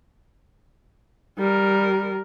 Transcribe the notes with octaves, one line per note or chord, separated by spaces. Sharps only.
G3 A#4